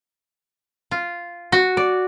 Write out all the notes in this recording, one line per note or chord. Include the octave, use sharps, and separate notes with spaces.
F4
F#4
D5